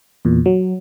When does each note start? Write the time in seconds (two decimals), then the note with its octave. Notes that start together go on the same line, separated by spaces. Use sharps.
0.25 E2 A#2
0.46 F#3